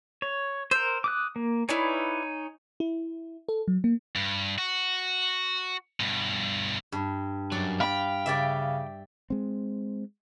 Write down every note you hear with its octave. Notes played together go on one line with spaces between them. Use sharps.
C#5
A#4 C5 E6 G6
D6 D#6 F#6
A#3
D#4 E4 B4 C#5 D5 G#5
E4
A4
F#3
A#3
G2
F#4
G2 B2
G2
F#2 F#3 D5
F5 G5 B5
C#3 G4 D5 E5
G#3 C4